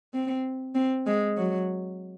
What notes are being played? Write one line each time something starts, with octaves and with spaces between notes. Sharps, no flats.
C4
C4
G#3
F#3